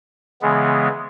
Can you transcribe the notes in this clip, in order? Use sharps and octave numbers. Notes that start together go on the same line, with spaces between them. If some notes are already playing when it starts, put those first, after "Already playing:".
C#3 E3 G#3 B3